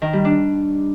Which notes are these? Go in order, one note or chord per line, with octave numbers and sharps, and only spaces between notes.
D#3
G3
D4